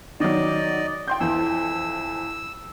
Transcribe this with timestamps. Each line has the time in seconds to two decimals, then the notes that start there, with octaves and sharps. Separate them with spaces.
0.20 D#3 F#3 D5 D#5
1.08 G5 C6 G6
1.20 F2 E3 E6